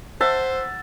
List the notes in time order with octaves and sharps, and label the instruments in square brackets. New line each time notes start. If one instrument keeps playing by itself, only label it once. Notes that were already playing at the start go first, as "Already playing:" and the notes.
[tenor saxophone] C5 [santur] E5 F#5 A5